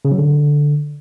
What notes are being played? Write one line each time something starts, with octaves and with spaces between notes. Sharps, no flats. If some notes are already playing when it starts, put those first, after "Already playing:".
C#3
F#3
D3